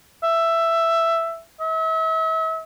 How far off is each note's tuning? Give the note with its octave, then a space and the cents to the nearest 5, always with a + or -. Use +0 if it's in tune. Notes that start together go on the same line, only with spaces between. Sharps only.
E5 +10
E5 -40